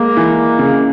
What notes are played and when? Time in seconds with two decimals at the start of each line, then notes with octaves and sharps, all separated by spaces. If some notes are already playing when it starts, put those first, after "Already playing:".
Already playing: G#3 A#3
0.17 E3
0.59 C#3